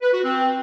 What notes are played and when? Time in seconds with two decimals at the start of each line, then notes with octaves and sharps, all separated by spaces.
0.01 B4
0.12 F#4
0.23 C4